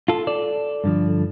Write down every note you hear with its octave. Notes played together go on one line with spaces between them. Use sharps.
F4 A4
A4 D5
G2 D3 F3